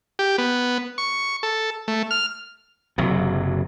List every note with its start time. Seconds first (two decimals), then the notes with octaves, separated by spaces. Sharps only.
0.19 G4
0.38 B3
0.98 C#6
1.43 A4
1.88 A3
2.11 F6
2.98 F#1 C3 F#3